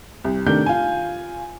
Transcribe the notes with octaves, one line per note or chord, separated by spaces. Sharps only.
C2
C3 D#3 A3 D4 A#4 G6
F4 G#5